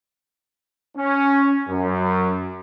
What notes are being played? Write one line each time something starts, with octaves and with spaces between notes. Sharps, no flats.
C#4
F#2